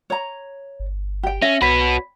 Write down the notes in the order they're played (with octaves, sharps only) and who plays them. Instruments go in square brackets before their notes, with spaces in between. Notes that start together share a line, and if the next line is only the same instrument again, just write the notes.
[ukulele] C#5 A#5
[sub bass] G1
[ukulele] G4 G5
[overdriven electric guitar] C#4 [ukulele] E5 [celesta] A#6
[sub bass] C2 [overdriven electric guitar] B3 F#4 [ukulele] C#5 [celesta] B5 B6